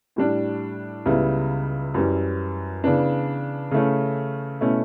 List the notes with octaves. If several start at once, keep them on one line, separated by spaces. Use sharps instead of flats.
A2 G3 D4
C#2 C#3 G3 B3 E4
F#2 E3 G3
C#3 E3 B3 D4
C#3 E3 A3 C#4
B2 A3 C#4 E4